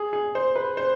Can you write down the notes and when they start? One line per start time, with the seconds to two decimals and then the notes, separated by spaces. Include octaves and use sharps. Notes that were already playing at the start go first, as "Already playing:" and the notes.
Already playing: G#4
0.13 G#4
0.35 C5
0.56 B4
0.77 C5